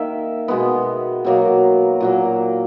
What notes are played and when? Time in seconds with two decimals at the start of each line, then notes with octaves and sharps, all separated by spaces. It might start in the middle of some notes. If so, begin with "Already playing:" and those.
Already playing: D#3 A#3 E5
0.48 B2 G#3 B3
1.25 B2 F#3 A#3
2.00 A#2 F#3 A#3